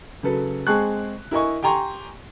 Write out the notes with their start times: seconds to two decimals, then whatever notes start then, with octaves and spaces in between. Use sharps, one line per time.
0.23 C#3 F#3 A4 B4
0.67 G#3 C4 G#4 A5 C#6 F#6
1.31 E4 A#4 D#5 G#5 C#6
1.63 G4 G5 G#5 A#5 C6 C#6